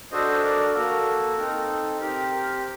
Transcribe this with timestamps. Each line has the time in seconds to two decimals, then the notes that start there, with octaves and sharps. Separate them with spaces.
0.12 D4 F#4 A4 C5 D#5
0.34 D#5
0.43 A#4 D5
0.74 A#3 F#4 A4 A#4
1.37 C4 D#4 A4 A#4
1.68 A4
2.00 C4 G4 A#4
2.32 A#4